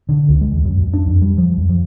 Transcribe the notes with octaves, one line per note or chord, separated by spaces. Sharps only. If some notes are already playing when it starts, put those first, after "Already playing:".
D3
C#2
G#3
D#2
F#2
F#2
D4
F2
G3
F3
F2
F3